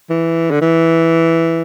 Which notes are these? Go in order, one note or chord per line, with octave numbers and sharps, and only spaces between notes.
E3
D3
E3